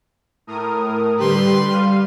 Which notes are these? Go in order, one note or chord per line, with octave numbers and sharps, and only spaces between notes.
A2 A#4 D#6
D3 G3 G4 B4 C6
G3 F5 D#7